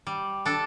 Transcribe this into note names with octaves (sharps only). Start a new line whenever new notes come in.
G3
D4 A4